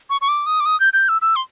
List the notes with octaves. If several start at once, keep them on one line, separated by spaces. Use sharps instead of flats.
C#6
C#6
D6
D#6
D6
D#6
G6
G6
E6
E6
C6